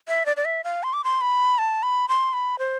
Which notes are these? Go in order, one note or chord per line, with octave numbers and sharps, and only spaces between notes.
E5
D5
D5
E5
F5
C6
D6
C6
B5
A5
B5
C6
B5
C5